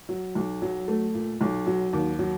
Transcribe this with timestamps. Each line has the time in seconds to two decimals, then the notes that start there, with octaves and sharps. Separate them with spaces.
0.09 F#3
0.35 B1
0.62 F#3
0.88 A3
1.14 A#2
1.41 B1
1.67 F#3
1.93 D#2
2.19 F#3